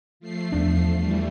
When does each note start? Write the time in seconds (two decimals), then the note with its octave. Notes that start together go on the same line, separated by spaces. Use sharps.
0.20 F3 A3 C7
0.52 E2 D4
0.96 E3 G3 A3